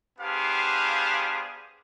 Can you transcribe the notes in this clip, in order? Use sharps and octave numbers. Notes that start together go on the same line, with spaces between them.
B3 D4 G4 G#4 C5 F5